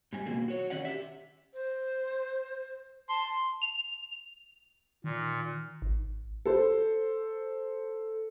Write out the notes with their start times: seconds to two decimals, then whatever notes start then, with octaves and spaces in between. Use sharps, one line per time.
0.13 G#2 G3 G#5
0.26 B2 D#3 A#3 F#4 G#4
0.48 F#4 C#5
0.70 D#3 C#4 D5 F#5
0.85 G4 E5
1.54 C5
3.09 A5 C6
3.62 F7
5.04 A#2 D#3
5.82 G#1
6.46 A4 C5